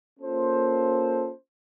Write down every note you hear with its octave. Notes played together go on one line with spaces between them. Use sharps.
A#3 C#4 F4 A4 C5